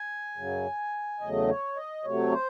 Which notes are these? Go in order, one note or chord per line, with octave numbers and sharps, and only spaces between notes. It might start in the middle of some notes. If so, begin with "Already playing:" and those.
Already playing: G#5
F#2 C#3 F#3
E2 C#3 F#3 A3 D#5
C#5
D#5
C3 F#3 A3 C#5
C5